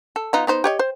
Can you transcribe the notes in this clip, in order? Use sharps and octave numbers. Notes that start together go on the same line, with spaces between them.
A4
B3 D#4 F4
B3 D#4 C5
G4 C#5 D#5
C5